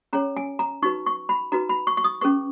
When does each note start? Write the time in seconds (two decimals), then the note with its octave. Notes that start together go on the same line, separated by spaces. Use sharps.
0.13 C#4 G#4 C#5 A#5
0.37 G#5
0.59 A#5
0.82 D#4 F#4 B4 C#6
1.06 C#6
1.29 B5
1.52 D#4 F#4 B4 A#5
1.69 B5
1.87 C#6
1.97 C#6
2.04 D#6
2.21 C#4 G#4 B4 C#6